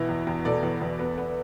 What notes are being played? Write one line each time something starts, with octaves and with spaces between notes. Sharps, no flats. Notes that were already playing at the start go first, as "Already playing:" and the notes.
Already playing: B2 E3 E5
E2
E2
B2 A4 D5
E2
E2
B3
B3